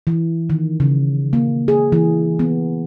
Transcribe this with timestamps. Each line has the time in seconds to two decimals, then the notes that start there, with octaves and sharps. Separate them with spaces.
0.07 E3
0.50 D#3
0.80 C#3
1.33 A#3
1.68 G#4
1.92 E3
2.39 B3